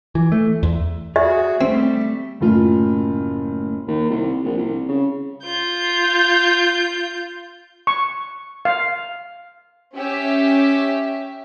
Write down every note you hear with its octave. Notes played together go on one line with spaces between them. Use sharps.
E3
A3
E2
F#4 G#4 E5
G3 A3 C4
F#1 A2 F4
D#2
C2
A#1
C2
C#3
F4 G6
C#6
F5
C#4 G4 E5